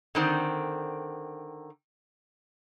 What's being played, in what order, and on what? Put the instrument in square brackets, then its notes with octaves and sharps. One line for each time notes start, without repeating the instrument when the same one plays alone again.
[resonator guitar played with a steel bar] D3 D#3 C4